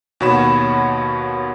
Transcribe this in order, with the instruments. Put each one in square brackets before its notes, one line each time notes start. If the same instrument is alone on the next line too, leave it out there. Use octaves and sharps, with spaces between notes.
[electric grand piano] D#2 B2 F#4 C#5 B5 E7